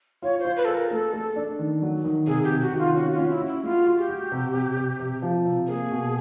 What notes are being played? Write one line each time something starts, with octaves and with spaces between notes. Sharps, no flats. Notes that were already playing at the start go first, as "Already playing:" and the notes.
F4 C#5
C5
F4
B4
G#4 A4
A#4
A3 A4
A3
D4
D#3
F#3
D#3
C3 G#4
G4
C3
F#4
D#3
F4
C#4 F#4
F4
C#4
E4
F#4
E4
G#3 F4
F#4
G4
F#4
C3
C3
C3
C3
F3
C3
A#3 G#4
B2